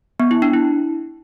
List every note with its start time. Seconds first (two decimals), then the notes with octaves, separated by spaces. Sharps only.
0.20 B3
0.31 E4
0.42 D4
0.53 E4